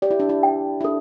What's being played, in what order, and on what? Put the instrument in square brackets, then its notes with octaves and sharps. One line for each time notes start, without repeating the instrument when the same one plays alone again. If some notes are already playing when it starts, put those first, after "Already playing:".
[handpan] G4 [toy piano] D5
[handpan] E4
D4
E4
[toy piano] G5
[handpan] E4
[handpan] D4 [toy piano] A4